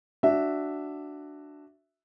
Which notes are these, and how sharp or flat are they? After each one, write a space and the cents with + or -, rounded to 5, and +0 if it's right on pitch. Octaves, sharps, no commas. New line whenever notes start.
D4 +0 F#4 +0 E5 +0